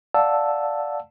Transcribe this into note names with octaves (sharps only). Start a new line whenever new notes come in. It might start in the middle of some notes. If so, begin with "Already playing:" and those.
D5 F5 F#5 A5 E6